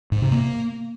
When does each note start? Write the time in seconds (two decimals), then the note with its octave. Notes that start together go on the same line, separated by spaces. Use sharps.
0.12 G#2
0.22 C3
0.32 A#3